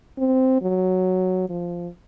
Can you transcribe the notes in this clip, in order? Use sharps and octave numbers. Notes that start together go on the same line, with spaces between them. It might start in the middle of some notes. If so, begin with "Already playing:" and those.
C4
F#3
F3